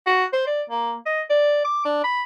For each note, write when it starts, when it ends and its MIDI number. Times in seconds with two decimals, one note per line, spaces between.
0.06 0.24 66
0.33 0.46 72
0.47 0.62 74
0.70 0.95 58
1.06 1.21 75
1.30 1.64 74
1.65 1.84 86
1.85 2.01 62
2.04 2.23 83